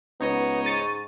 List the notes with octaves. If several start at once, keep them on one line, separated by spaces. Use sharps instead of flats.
C#2 B3 D#4 C#5 D#5
G#2 C#6 A6 D#7